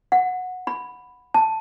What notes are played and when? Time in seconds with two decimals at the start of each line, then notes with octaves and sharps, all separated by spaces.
0.12 F#5
0.67 B5
1.34 A5